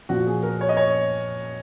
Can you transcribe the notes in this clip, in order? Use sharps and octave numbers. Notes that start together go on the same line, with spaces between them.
A#2 F3 F#4
G#4
A#4
C#5
D#5
C#5